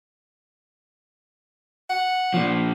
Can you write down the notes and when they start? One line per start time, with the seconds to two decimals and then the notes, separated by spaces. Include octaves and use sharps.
1.90 F#5
2.34 A#2 F3